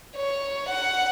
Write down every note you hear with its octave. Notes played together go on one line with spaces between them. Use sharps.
C#5
F#5